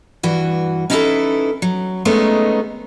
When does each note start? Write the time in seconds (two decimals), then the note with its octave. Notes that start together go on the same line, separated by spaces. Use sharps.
0.23 G2 E3 F#4
0.90 C#4 D#4 E4 G4 A4 B4
1.62 F#3
2.05 D#3 G#3 A3 B3 C#4 D#4